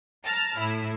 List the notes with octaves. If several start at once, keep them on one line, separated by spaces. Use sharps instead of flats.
A5 A#5 F6
A2 E4